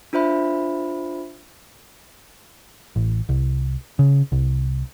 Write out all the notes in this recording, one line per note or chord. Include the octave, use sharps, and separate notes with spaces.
D4 F4 C5 E5 B5
A1
C2
C#3
C2